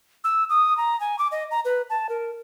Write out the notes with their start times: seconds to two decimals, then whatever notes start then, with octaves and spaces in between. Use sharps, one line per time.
0.24 E6
0.49 D#6
0.78 A#5
1.00 G#5
1.19 D6
1.32 D#5
1.51 A#5
1.65 B4
1.90 A5
2.09 A#4